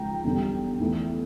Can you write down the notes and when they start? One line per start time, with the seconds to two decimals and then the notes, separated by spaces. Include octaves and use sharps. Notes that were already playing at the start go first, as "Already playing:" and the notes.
Already playing: C#2 C#3 F3 G5 A#5
0.24 E2 D3 G3
0.79 E2 E3 A3